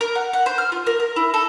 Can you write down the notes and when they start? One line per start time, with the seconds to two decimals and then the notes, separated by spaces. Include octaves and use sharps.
0.01 A#4
0.15 F#5
0.33 F#5
0.46 C5
0.58 F6
0.72 F4
0.87 A#4
1.00 A#4
1.16 E4
1.34 A4